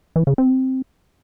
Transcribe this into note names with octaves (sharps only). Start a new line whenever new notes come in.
E3
C#3
C4